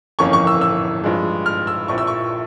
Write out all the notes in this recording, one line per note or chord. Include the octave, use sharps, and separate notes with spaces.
G1 F2 E3 A#3 C#4 C#6
C#6
E6
E6
G2 F3 G#3
F6
E6
A#1 A#2 F3 C4 E4 C#6
E6
C#6